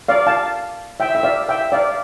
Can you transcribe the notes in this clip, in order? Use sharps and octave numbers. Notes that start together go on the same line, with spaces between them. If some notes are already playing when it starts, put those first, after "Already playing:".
D5 F5
F5 A5
E5 G5
E5
D5 F5
E5 G5
D5 F5